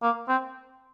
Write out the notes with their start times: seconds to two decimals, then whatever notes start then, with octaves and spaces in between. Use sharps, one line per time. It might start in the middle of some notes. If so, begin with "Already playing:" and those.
0.02 A#3
0.28 C4